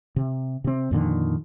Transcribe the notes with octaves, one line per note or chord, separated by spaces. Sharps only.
C3
C3 C4
F2 A#2 D3 D#3